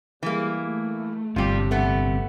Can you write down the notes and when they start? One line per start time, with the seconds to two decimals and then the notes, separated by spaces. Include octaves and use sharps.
0.23 E3 G3 G#3 A#3
0.64 A3
1.36 G1 A2 C3 G3 D4 F4 G4
1.71 A3 B3